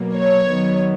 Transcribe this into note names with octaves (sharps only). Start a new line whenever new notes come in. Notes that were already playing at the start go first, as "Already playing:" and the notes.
Already playing: B2 F#3 A#3
C#5
D#3 F#3 B3